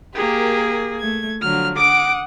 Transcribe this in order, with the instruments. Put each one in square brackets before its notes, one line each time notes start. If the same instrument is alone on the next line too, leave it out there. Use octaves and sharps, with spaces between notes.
[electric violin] A#3 G#4 [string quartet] G4 A#4
[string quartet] A3 G#6
[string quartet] D3 F3 F#3 [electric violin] F6
[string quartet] F#5 D#6 [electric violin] D6 D7